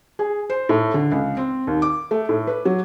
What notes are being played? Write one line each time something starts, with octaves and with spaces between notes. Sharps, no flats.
G#4
C5
A2
D3
C#2
C4
D#2
D6
A3
A2
B4
F#3